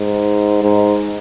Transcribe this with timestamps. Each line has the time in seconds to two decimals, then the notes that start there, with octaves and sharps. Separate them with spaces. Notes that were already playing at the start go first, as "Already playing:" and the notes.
Already playing: G#2
0.63 G#2